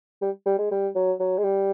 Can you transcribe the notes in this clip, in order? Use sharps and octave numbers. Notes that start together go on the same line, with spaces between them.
G3
G3
G#3
G3
F#3
F#3
G#3
G3